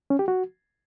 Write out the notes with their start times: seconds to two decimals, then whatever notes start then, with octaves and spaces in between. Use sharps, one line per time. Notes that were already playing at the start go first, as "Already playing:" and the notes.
0.10 C#4
0.19 G4
0.28 F#4